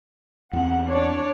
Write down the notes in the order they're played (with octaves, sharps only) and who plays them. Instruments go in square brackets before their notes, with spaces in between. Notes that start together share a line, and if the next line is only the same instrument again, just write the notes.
[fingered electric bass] E2 C4 [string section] F#5
[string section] D4 C#5 D5